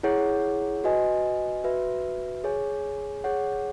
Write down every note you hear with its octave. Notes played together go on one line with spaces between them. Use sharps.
E4 G#4 C#5 F#5
F#4 B4 D#5 G#5
F#4 B4 E5
G#4 C#5 G#5
G#4 C#5 F#5